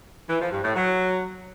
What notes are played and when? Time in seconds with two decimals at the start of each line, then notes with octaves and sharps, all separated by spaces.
0.29 E3
0.40 F3
0.52 G2
0.63 A2
0.75 F#3